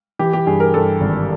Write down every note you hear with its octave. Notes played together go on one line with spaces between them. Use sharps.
E3 G4
G4
G2 G#4
A#4
G2 A4
G#1